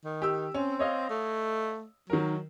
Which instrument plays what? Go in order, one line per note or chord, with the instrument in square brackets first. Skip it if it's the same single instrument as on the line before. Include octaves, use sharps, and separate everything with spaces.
[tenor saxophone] D#3
[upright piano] G4 E6
[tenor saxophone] C4 [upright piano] C#4
[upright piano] C#5 D#5 F5
[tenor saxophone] A3
[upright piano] D#3 A#4 [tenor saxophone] F#3